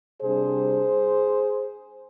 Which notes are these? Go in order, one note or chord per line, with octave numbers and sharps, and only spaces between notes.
C3 G3 D4 G#4 C5